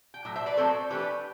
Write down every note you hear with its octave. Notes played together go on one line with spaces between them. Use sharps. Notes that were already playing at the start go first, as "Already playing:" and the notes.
G5
A2 F#3
C5 E5
B4 D5
A2 F#3 A3 C4 A4 C5
E3 A3 D4 G4 B4